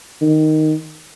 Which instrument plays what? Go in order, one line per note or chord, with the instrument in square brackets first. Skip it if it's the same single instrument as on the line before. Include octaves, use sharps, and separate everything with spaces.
[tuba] D#3